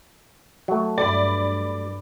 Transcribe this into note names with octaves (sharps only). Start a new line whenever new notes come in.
F#3 A3
G2 D5 B5